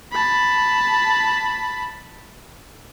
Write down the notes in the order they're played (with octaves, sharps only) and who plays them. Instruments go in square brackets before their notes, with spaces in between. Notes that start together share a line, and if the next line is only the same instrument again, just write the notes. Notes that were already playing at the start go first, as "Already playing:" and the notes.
[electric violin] A5 B5